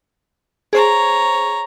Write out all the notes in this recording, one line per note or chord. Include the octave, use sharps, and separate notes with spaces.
G#4 C5 C#5 A#5